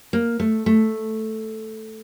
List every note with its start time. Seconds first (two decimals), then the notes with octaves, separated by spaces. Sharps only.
0.13 A#3
0.40 A3
0.66 A3